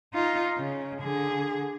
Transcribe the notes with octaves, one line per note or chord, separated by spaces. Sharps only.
D#4 F4
C#3
D3 G#4